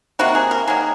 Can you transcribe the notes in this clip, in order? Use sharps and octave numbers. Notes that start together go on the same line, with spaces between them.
C3 D#3 A#3 F#4
G#4
A#4
D#3 F#3 A#3 G#4